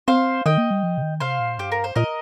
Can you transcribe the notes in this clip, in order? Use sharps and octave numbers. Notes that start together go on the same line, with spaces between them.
C4 C5 F5
D#3 D#5 G5
A#3
G3
F3
C3
D#3
C3 C5 F5
A#2
G2 G4
A#4
C5
A#2 A#4 D#5